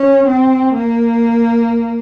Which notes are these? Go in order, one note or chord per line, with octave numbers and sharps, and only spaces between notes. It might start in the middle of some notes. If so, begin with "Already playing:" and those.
Already playing: C#4
C4
A#3